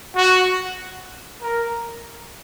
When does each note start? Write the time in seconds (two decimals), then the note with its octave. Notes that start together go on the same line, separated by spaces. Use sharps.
0.16 F#4
1.42 A#4